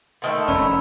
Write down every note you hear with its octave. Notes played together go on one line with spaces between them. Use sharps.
D3 D#3 A3
F1 F#2 C#4 D5 B5 E6